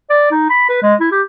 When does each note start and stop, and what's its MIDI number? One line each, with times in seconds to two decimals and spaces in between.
0.10 0.26 74
0.31 0.46 63
0.50 0.67 83
0.69 0.80 71
0.82 0.94 56
1.00 1.08 64
1.12 1.22 67